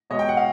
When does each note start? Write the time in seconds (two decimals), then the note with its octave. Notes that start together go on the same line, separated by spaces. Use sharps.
0.10 B2 G#3 C#5 D#5
0.19 G5
0.29 F#5
0.37 F5